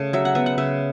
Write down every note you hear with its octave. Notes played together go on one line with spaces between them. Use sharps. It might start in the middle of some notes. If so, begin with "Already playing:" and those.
Already playing: C#3 A3
F#3 E5
F#5
B3 E5
F#5
C#3 E5